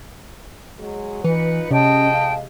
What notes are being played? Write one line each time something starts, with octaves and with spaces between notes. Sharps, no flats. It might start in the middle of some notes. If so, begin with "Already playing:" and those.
F#3 G#3
E3 D#4 F4 B4 C#7
F2 C3 G#3 C#4 D#5 G5 A5
F5